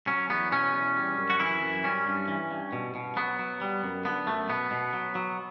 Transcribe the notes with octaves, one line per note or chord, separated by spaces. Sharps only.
F#3 C#4
E2 B3
B2 C#4
E2
G3
F#2
F#4
E3 E4
F#2
G3 C#4
G2
E3
G2
B2
B2
F#3 B3
F#3
G3
F#2
D3 B3
F#2 A3
B2 B3
B2
F#3
F#3